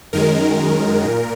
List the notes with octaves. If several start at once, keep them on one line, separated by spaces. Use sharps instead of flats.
F#2 D#3 G#3 A#4
A#2